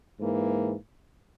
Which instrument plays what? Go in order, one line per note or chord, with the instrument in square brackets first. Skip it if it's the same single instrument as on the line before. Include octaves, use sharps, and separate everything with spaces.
[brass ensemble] G#2 E3 A#3